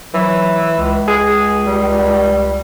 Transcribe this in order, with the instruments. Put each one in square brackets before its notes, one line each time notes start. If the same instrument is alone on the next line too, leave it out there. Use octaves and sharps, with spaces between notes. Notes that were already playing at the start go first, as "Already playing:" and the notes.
[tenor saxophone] E3 [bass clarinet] F#3
[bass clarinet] C#2
[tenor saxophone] G#4
G3